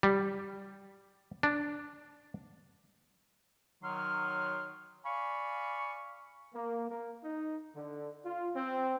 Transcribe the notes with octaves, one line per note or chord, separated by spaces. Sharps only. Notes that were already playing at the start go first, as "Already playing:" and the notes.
G3
D4
D#3 F#3 C6 F6
D5 F5 G#5 B5 C#6
A#3
A#3
D#4
D3
F4
C4